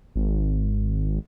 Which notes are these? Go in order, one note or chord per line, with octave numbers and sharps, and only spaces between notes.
G#1